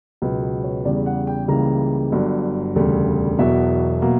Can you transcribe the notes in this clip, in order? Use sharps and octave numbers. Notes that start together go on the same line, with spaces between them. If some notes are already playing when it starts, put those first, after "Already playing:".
C#2 B2 F#3 B3
B4
C#5
E2 C#3 G3 D5
F#5
G5
C#2 C#3 E3 G3 A#3 A#5
G1 G2 F#3
E1 D2 C#3 G3
E1 E2 B2 F#3 E5
B2 F#3 A#3